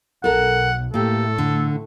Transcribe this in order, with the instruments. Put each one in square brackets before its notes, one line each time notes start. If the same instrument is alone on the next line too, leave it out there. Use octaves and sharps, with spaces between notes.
[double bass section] B1 [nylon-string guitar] A4 A#4 [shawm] F#5
[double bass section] A2 A3 [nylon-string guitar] A#3 G4 [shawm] A4
[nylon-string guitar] D3